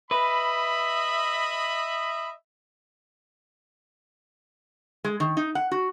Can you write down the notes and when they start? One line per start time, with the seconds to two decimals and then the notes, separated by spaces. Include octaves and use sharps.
0.11 B4 D#5 E5 B5
5.04 G#3
5.20 D#3
5.37 D#4
5.55 F#5
5.71 F#4